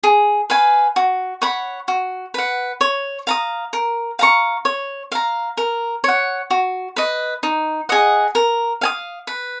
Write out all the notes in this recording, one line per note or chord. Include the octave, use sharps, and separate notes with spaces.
G#4
B4 F5 G#5
F#4
C#5 F#5 B5
F#4
B4 F#5
C#5
F5 A#5 D#6
A#4
F5 A#5 C#6
C#5
F5 A#5
A#4
C#5 F#5
F#4
B4 D#5
D#4
G#4 D#5 F#5
A#4
F5 G#5 D#6
B4